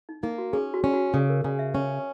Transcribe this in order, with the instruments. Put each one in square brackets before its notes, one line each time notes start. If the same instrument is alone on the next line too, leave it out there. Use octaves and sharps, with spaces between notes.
[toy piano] D#4
[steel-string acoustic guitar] A#3 [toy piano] D#4
[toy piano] F#4
[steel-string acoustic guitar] C#4 [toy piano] G#4
[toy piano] F#4
[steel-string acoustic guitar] C#4
[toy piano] F#4
[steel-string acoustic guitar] C#3 [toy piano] G#4
[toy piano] A#4
[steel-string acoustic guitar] C#3 [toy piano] G#5
[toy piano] E5
[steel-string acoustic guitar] C#4